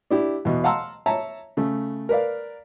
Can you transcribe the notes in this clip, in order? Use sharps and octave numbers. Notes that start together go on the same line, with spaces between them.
D4 E4 G4
E2 B2
F5 F#5 A5 A#5 C6 E6
C#5 E5 A5 A#5
C#3 A3
A#4 B4 D5 F5